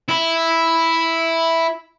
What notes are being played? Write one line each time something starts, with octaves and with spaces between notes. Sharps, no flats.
E4